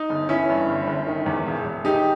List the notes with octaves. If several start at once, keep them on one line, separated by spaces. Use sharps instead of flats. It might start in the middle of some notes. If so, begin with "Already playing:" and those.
Already playing: D#4
G1
E3 C#4 E4
G2
G1
G1
D#3
E2
E1
E1
D#3 D#4 G4